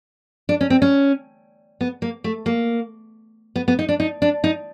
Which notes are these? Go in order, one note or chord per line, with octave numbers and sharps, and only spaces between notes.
D4
C#4
C4
C#4
B3
A#3
A3
A#3
B3
B3
D#4
D4
D#4
D4
D#4